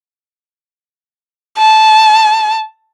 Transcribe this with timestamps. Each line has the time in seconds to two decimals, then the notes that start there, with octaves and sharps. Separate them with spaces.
1.58 A5